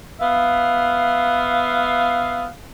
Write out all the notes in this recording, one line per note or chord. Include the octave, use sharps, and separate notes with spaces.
B3 E5 F5